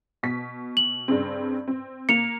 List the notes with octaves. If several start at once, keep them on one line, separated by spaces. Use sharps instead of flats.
B2 B6
F#7
G2 C#3 C4
C4
A#3 C#7 F7